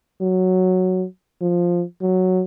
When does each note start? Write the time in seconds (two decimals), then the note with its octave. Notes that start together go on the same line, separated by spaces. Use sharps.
0.21 F#3
1.41 F3
2.01 F#3